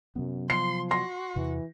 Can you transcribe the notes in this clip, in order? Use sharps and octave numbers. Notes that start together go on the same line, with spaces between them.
F#2 C3 F#3 B3
F3 C6 C7
F#4 C6 A#6
E2 C3 E3